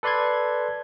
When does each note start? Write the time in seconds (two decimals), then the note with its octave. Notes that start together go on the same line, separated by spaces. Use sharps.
0.03 A4 B4 D5 C6 F#6 G#6